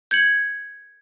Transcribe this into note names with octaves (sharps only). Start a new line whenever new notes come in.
G6 G#6 C#7 F#7